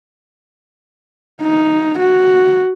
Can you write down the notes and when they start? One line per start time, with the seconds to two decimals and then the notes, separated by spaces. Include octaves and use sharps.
1.42 D#4
1.99 F#4